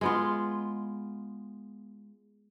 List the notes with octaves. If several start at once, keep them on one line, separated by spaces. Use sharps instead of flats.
G#3 B3 F4